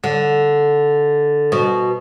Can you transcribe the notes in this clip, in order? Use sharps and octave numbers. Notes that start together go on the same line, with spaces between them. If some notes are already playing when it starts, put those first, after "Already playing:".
D3
B2